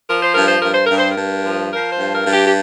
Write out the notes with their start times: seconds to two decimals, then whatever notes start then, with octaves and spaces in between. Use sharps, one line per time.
0.09 F3 A#4
0.22 C5
0.34 G2 A#4
0.48 C5
0.61 G2 A#4
0.73 C5
0.86 G2 A#4
0.98 C5
1.12 A#4
1.17 G2
1.45 F3
1.72 F3 A#4
1.93 C5
1.99 G2
2.13 A#4
2.26 G2
2.33 G4
2.46 G4